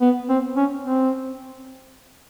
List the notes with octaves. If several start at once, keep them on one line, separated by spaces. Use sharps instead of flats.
B3
C4
C#4
C4